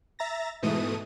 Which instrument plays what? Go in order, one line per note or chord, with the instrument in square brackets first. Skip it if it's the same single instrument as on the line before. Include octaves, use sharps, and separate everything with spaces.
[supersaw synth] E5 A#5 A6 A#6
G#2 B2 E3 A3 D#6 D#7